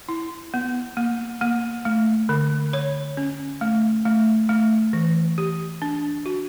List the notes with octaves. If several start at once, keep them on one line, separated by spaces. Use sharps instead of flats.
E4
B3
A#3
A#3
A3
D3
C#5
C#4
A3
A3
A3
E3
G4
D4
F#4